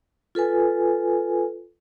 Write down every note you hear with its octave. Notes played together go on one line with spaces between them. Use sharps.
F4 A4 B4 G#5